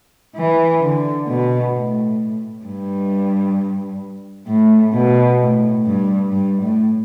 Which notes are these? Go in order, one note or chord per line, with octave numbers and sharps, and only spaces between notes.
E3
D3
B2
A2
G2
A2
B2
A2
G2
G2
A2